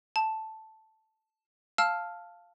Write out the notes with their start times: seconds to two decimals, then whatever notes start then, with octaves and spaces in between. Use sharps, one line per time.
0.16 A5
1.78 F5 A5 E6 F6